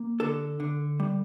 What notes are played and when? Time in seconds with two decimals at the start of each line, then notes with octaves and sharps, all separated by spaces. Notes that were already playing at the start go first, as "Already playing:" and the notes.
Already playing: A#3
0.20 D3 A4
0.60 D3
1.00 G3